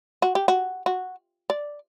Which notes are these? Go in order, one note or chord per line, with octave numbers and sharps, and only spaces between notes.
F#4
G4
F#4
F#4
D5